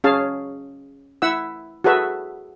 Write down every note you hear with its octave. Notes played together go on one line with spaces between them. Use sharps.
C#4 G#4 F5 A5
E4 E5 F#5 E6
F#4 G#4 A4 B4 E5